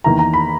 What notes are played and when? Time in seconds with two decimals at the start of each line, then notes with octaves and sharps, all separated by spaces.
0.04 E2 D#3 A#3 E4 A#5
0.19 A#5
0.34 B5